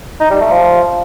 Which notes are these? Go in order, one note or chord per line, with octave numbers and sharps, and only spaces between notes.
D#4
G3
A3
F3